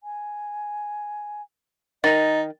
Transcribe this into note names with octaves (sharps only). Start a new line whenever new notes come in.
G#5
D#3 D#4 D#5 A6